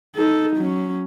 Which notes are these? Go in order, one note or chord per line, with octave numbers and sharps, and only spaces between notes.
D#4 A4
F#3 C#4